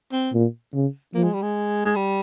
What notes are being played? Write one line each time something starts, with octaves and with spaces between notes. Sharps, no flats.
C4
A#2
C#3
F3 A#3
G#3
G3
G#3
G#3
G3